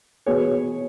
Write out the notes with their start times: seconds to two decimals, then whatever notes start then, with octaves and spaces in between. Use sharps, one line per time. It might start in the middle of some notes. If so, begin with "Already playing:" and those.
0.26 B2 B3 G#4 C#5